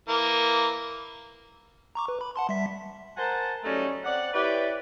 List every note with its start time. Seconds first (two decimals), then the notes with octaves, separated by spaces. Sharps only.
0.08 E3 A#3
1.95 A#5 C#6 D6
2.08 B4
2.21 B5
2.36 F#5 A5 C6
2.49 G3 E5 B6
3.17 A#4 C5 F#5 G#5 A5
3.64 F#3 G3 A3 C#4 D#4
4.04 C4 D5 F#5
4.34 E4 G4 B4 C#5 D5